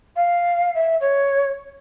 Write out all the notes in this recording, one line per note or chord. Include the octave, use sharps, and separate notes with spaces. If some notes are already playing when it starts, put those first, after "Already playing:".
F5
E5
C#5